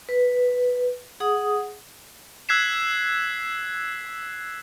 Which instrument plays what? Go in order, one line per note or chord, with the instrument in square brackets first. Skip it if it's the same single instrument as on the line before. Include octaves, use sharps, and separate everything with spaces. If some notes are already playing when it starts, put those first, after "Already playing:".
[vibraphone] B4
G#4 F#5 D#6
[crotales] E6 F#6 G#6 B6 C7 E7